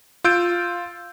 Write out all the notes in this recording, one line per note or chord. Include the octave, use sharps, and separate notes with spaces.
F4 E6 G6 D7